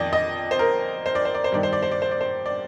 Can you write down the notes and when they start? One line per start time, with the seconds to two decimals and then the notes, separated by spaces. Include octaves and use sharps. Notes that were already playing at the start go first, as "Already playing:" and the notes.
Already playing: F2 D#3 D5 D#5
0.13 D#5
0.51 C5
0.59 A#4
1.06 C5
1.15 D5
1.25 C5
1.35 D5
1.44 C5
1.52 G2 D#3 D5
1.63 C5
1.73 D5
1.83 C5
1.91 D5
2.02 C5
2.11 D5
2.21 C5
2.46 D5